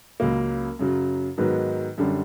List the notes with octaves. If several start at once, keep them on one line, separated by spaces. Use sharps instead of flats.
C#2 C#3 F#3 A#3
F#2 C#3 F#3
G#2 D#3 F#3 B3
F#2 D3 G3